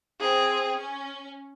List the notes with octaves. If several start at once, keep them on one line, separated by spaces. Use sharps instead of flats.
C4 G#4
C#4